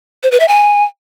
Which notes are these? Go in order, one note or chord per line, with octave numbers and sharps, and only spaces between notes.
C5
B4
E5
G#5